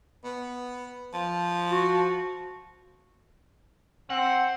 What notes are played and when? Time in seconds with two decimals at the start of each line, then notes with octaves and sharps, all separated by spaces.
0.24 B3
1.13 F3
1.71 F#4
4.10 C4 F#5